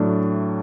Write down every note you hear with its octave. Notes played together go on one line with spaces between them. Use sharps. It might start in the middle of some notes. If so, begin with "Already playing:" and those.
Already playing: A2 F#3 A3 D4